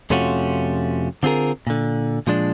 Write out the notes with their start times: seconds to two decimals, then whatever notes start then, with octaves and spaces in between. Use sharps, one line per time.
0.10 F2 C3 A3 C#4 F4 F#4
1.23 D3 C4 F4 G#4 A#4
1.67 A#2 D3
2.27 A#2 F3 G#3 D4